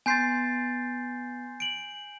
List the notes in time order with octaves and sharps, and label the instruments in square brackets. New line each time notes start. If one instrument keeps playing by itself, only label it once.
[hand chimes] B3 C6 A6 [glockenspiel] G#5 G6 C7
[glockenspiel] D7 F#7